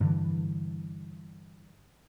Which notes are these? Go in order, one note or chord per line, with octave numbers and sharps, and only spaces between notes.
G2 D3 E3